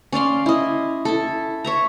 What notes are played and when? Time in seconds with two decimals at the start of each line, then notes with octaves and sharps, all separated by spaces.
0.12 C#4 D5 F5 C6
0.46 E4 D#5
1.05 E4 A4
1.64 C#5 E5 A#5